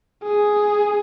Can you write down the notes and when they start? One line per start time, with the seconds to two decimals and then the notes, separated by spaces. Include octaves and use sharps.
0.23 G#4